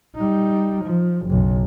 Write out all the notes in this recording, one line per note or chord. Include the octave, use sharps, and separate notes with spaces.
G3 D#4
F3
F#1 B1